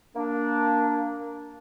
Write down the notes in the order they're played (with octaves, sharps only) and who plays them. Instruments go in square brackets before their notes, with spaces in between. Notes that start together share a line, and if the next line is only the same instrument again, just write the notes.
[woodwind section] A#3 D4